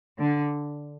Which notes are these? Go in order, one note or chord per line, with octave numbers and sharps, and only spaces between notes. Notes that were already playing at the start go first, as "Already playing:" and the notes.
D3